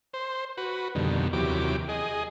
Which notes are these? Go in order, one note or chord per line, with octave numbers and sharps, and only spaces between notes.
C5
F#4 B4
F2 B2 D3 D#3 G3
D#2 C3 E3 F#3 G4 D6
G#4 D#5